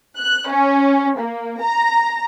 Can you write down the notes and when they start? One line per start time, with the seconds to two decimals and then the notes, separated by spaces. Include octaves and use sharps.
0.17 F#6
0.49 C#4
1.18 A#3
1.61 A#5